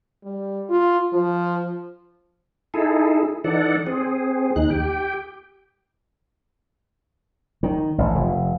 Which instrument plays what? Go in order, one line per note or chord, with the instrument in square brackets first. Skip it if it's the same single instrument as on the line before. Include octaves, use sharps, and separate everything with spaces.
[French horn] G3
F4
F3
[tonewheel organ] D#4 E4 G#4 A4
E3 D#4 A4 D5 F#5
C4 G#4
D#2 D#4 F#6
G4 G5
[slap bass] D#3
A1
F1